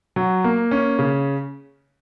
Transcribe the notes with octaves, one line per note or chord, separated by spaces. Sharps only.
F#3
A#3
C#4
C#3